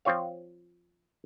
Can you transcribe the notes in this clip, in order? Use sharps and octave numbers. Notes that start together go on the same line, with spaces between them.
F3 C4 F4 C#5 F5